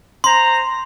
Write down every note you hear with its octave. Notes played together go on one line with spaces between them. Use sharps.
C5 A#5 C6